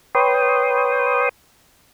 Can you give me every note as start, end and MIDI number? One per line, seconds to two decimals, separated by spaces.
0.15 1.29 71
0.15 1.29 73
0.15 1.29 79
0.15 1.29 84
0.15 1.29 87